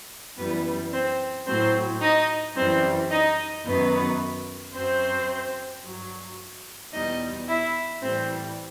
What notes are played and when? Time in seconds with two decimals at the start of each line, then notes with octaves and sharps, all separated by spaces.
0.37 F#2 E3 G3 B3 B4
0.92 C4 C5
1.46 A2 F#3 C4 C5
2.01 D#4 D#5
2.56 F#2 E3 G3 C4 C5
3.10 D#4 D#5
3.65 F#2 D#3 F#3 B3 B4
4.74 F#2 F#3 C4 C5
5.84 G2 F#3
6.93 E2 B2 G3 D#4 D#5
7.48 E4 E5
8.02 A2 E3 G3 C4 C5